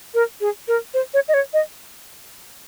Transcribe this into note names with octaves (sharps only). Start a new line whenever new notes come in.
A#4
G#4
A#4
C5
C#5
D#5
C#5
D#5